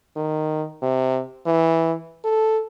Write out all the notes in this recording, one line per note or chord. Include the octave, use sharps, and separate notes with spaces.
D#3
C3
E3
A4